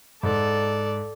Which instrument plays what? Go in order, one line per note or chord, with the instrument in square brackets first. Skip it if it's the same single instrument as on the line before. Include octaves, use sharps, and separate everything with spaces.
[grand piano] G#2 [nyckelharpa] A4 D5